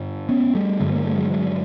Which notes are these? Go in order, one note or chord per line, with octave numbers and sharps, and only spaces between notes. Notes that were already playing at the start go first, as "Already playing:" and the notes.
Already playing: G2 D3
B3 C#4
G3 A3
G2 D3 F#3 G#3
G#3 A#3
G3 A3
F#3 G#3
F#3 G#3